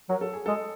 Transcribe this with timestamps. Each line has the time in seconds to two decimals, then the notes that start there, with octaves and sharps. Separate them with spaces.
0.09 F#3 A#4
0.21 A4
0.33 G#4
0.46 G#3 A4